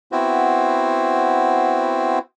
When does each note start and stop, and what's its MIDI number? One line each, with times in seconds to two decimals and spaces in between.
0.12 2.19 59
0.12 2.19 60
0.12 2.19 64
0.12 2.19 66
0.12 2.19 72